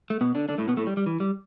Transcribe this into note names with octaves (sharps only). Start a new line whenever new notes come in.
A3
B2 B3
D3 D4
D3 D4
A2 A3
B2 B3
A2 A3
G3
G3
E3
G3